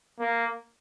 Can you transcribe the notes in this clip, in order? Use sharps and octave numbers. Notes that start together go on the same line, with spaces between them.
A#3